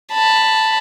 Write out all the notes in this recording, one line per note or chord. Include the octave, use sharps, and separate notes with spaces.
A5 B5